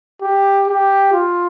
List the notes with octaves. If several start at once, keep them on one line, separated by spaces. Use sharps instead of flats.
G4
G4
F4